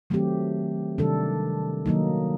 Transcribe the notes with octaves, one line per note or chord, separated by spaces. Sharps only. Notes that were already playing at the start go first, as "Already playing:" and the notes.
D#3 F#3 A3 C4 G4
C3 D#3 G3 D4 A4
D#3 F#3 A#3 D#4